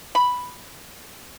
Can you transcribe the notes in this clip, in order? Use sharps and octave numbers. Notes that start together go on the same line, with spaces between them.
B5